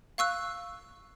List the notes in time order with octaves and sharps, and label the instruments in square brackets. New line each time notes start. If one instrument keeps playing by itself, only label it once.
[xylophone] F5 C#6 E6 F#6